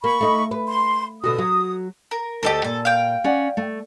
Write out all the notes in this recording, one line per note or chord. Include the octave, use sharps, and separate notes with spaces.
A#3 B5 C#6
A3 D#4
B4
C6
B2 D3 F#4 D#6
F#3 F#4
A#4
D2 G4 A4 A#4 D#5
A#2 A4
F5 G5
C#4 D5 F#5
A3